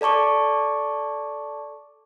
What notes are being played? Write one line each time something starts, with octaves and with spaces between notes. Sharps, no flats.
A4 D5 A5 C#6 D6